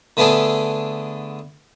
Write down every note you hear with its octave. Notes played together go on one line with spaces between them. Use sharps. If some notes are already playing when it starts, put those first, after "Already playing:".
D3 A3 B3 D4 G#4 A4